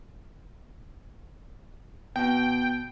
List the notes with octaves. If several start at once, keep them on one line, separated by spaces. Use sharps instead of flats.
B2 G5